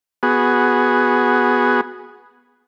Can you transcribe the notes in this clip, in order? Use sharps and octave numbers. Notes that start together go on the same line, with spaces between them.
B3 F#4 G#4